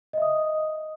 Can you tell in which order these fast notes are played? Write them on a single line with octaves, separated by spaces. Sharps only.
D#5 E5 D#6